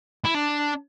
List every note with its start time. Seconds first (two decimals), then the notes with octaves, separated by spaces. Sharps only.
0.24 E4
0.34 D4